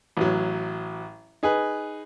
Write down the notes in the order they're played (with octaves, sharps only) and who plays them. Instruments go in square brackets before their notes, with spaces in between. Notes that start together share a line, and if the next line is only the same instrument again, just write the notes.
[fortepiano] A1 F#3
D#4 G#4 B4